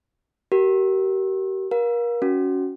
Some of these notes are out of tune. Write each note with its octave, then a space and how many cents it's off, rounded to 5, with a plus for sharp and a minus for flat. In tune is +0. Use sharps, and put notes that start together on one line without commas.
G4 -40 A#4 +0
A#4 +30 F5 +20
C#4 +10 F#4 +0